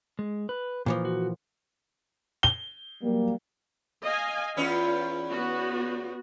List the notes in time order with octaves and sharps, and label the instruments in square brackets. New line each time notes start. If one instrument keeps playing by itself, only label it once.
[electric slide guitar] G#3
B4
[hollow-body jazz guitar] A#2 E3 F3 [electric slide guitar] F4
[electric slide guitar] F#4
[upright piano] G7
[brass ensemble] F#3 G3 A#3
[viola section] D#5 F5 G#5
[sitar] E2 C#4 B4 [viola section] F4
[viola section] B3 F#4